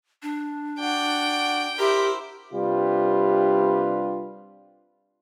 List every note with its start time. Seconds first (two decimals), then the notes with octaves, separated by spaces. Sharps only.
0.23 D4
0.79 F#4 D5 G5
1.79 E4 G4 A#4 C5
2.53 C3 G3 D4 F4 G4 B4